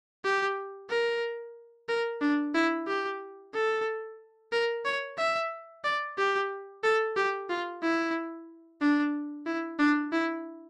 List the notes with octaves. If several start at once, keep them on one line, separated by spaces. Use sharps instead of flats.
G4
A#4
A#4
D4
E4
G4
A4
A#4
C#5
E5
D5
G4
A4
G4
F4
E4
D4
E4
D4
E4